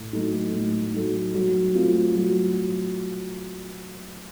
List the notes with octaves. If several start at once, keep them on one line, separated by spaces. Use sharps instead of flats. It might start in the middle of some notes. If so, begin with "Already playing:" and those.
Already playing: A2
F#3 A3 D#4 A4
A2
F#3 A3 D#4 A4
F#3
A3 C4 F4
F#3